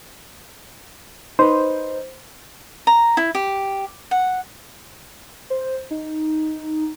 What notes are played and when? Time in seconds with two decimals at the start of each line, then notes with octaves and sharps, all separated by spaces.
1.39 D#4 B4 C5
2.87 A#5
3.17 E4
3.35 G4
4.11 F#5
5.50 C5
5.91 D#4